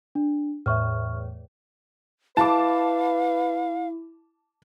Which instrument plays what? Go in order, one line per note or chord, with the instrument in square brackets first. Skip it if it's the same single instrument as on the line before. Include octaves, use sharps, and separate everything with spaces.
[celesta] D4
[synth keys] E2 A2 [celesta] E5 C#6 F6
[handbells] E4 [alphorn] B4 [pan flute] F5 [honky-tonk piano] A5 D6